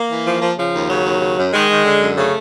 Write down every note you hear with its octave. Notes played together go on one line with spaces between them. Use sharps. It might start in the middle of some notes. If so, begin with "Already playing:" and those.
Already playing: A#3
E3
F3
F3
C#3 F3
D#2
C#3 F#3
D#2
C#3
F#2
D#3 G#3
D#3
D3
F#2
C#3 A3